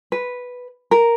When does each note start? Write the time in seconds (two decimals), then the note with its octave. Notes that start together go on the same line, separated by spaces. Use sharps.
0.12 B4
0.91 A#4